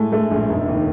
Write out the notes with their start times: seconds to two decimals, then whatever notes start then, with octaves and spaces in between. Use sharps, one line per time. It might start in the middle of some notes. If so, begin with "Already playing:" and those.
Already playing: A2 G#3 A3
0.12 G#3 A3
0.31 A#1
0.49 F1
0.67 D#2